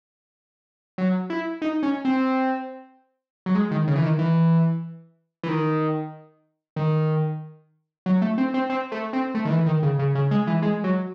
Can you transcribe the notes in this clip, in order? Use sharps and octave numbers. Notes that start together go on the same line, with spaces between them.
F#3
E4
D#4
C#4
C4
F#3
G#3
D#3
C#3
E3
D#3
E3
E3
D#3
D#3
F#3
A3
C4
C4
C4
A3
C4
A3
D#3
E3
D#3
C#3
C#3
C#3
G#3
E3
G#3
F#3